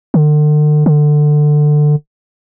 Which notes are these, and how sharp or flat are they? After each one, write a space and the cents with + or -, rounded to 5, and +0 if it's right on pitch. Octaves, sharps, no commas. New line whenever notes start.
D3 +40
D3 +20